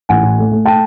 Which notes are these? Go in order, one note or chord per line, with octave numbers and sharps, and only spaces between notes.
A1 F#5 G#5
A2
A3
A3
G5 A5